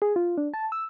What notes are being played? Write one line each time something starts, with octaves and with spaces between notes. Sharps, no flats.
G#4
F4
D4
A5
E6